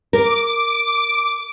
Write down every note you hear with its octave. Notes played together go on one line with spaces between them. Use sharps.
A#4 D6